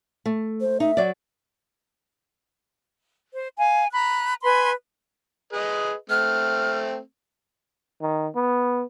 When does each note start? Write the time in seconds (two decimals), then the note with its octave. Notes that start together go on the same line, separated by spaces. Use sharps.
0.26 A3
0.61 C5
0.80 D#4 E5
0.97 F#3 D5
3.33 C5
3.59 F5 G#5
3.93 A#5 B5 F#6
4.43 B4 G#5 B5 C6
5.53 G#4 B4 D#5
6.10 A3 C4 F6
8.02 D#3
8.35 B3